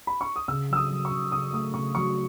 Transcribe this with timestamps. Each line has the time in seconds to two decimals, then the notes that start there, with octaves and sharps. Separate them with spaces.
0.07 B5
0.21 C#6
0.36 D#6
0.48 C#3 E6
0.70 F#3 E6
0.76 D#6
0.90 F#3
1.05 C#6
1.11 C#3
1.32 C#3 D#6
1.53 A3 D#6
1.74 C#3 C#6
1.95 F#3 C#6